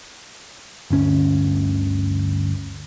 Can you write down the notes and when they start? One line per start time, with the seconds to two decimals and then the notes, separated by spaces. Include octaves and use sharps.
0.90 G1 D2 C#4